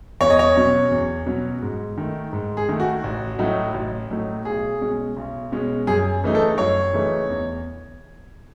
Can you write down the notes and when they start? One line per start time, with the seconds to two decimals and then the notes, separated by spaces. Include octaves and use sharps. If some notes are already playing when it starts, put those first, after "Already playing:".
0.21 E2 C#5
0.30 D#5
0.39 C#5
0.56 B2 F#3 C#4
0.91 E2
1.26 B2 F#3 C#4
1.62 G#2
1.98 D#3 A3
2.33 G#2
2.57 G#4
2.69 D#3 A3
2.80 F#4
3.04 A1
3.39 A2 F#3 A3 D#4
3.74 A1
4.10 A2 F#3 A3 D#4
4.45 B1 G#4
4.81 B2 G#3 C#4
5.16 B1
5.52 B2 G#3 C#4
5.87 F#2 G#4
6.23 C#3 E3 A3 D#4
6.35 A4
6.58 F#2 C#5
6.93 C#3 E3 A3 D#4
7.29 E2